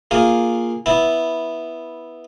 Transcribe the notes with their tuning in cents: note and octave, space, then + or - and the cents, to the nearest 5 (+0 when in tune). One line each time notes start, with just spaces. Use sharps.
A#3 +0 F4 +0 G#4 -10
B3 -5 E4 -10 A5 -15